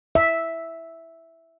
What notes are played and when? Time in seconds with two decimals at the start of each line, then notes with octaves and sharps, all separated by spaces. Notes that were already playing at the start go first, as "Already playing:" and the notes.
0.15 E5